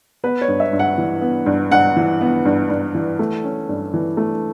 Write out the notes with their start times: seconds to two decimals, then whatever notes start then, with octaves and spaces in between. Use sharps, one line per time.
0.24 B3 B4
0.41 C#5
0.48 G2
0.60 E5
0.73 G2
0.79 F#5
0.98 E3
1.21 B3
1.46 G2
1.71 G2 F#5
1.96 E3
2.21 B3
2.45 G2
2.70 G2
2.95 E3
3.19 A3
3.44 C#4
3.69 G2
3.94 E3
4.17 A3